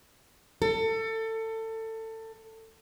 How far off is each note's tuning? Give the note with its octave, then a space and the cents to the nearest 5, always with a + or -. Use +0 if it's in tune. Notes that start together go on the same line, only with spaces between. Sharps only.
A4 +25